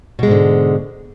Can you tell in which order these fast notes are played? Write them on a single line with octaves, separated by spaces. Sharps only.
B2 G#3 G#2 D3